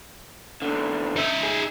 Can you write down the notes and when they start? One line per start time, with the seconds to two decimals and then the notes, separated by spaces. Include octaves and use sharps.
0.62 E2 D3
1.16 D#4 E5
1.43 G#4